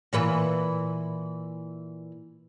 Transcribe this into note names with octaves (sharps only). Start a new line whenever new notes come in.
A#2 E3 B4